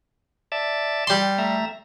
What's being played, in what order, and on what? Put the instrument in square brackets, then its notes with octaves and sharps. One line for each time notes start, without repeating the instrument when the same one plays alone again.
[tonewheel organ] D5 E5 A5
[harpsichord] G3 C6
[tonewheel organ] A3 E5 A#5